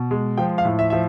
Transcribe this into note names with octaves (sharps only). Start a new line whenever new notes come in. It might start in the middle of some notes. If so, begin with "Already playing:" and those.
Already playing: B2
G#3
F3 G5
F5
A2
E5
F3 E5